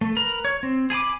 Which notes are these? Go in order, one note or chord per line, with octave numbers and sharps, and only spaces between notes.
A3
A#4 B4 A#5
C#5
C4
G#4 G#5 B5 D6